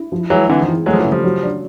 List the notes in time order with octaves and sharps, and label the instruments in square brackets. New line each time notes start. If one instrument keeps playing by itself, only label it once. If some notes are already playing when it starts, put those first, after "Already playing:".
Already playing: [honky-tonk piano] E4
F3
[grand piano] E3 F#3 [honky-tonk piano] G#3
[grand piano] D3 E3 [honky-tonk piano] C4
[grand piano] D#3 F3
[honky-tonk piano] E3
[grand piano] F#3 G#3 [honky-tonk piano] A3
[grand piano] F3
E3 F#3
[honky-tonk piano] C#3
[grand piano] F3 G3
[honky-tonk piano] F#3
D4